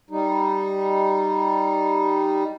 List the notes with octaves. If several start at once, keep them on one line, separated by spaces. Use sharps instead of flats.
G3 D#4